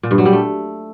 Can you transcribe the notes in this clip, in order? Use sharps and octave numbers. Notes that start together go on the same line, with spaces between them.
A#2
G2
F#3
G3
A3